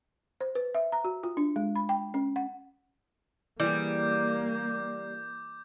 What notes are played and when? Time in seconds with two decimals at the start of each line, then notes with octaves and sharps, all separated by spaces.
0.41 C5
0.55 B4
0.75 E5
0.92 A#5
1.04 F#4
1.23 F4
1.37 D4
1.56 G#3
1.76 B5
1.89 G5
2.14 C#4
2.36 F#5
3.60 E3 G3 A#3 G#4 D6 G6